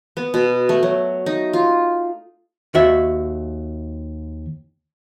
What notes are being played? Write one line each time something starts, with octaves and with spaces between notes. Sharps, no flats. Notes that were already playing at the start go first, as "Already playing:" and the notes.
B3
B2
A3
F#3
D#4
F4
D#2 F#4 E5